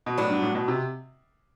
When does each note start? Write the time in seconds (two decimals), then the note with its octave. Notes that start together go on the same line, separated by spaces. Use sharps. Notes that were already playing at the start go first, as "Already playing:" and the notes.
0.06 B2
0.18 A2 F#3 B3 D4
0.30 G2
0.42 A2
0.55 B2
0.68 C3